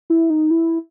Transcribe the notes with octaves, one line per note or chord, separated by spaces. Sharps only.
E4
D#4
E4